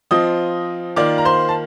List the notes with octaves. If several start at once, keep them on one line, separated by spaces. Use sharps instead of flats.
F3 C4 F4 D#5 D#6
D#3 A#3 F4 D5 D6
A#5
C5 C6
A5